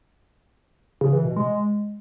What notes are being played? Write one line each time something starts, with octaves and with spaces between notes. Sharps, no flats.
C#3
E3
B2
G#3